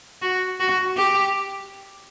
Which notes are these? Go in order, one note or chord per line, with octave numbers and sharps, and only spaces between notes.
F#4
F#4
G4